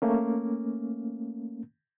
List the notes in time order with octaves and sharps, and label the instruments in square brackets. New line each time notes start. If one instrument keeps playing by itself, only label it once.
[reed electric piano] A3 A#3 C#4